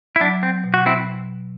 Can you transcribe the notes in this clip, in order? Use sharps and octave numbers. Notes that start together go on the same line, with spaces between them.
E4
F#3 D4
C4
B2
F#4
C4 E4